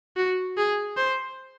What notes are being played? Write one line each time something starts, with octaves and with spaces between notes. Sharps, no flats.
F#4
G#4
C5